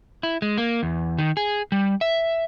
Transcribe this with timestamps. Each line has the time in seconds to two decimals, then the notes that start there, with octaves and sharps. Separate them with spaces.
0.23 E4
0.42 G#3
0.58 A#3
0.83 E2
1.19 D#3
1.37 G#4
1.72 G3
2.01 E5